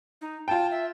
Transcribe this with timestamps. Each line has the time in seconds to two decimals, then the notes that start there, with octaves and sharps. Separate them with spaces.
0.21 D#4
0.48 F4 G5 A5
0.71 E5